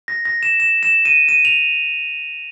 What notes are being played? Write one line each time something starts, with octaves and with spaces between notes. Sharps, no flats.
A#6
A#6
E7
E7
E7
D#7
D#7
F7